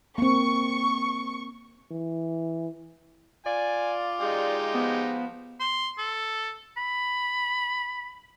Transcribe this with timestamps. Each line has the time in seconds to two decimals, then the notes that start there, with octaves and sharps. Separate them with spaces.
0.18 A#3 C4 C#6
1.91 E3
3.46 F4 D5 G#5
4.20 G#3 D#4 G4
4.75 F3 B3
5.60 C6
5.98 A4
6.77 B5